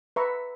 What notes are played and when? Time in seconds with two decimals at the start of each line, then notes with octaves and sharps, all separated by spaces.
0.16 B4 E5 A#5 C#6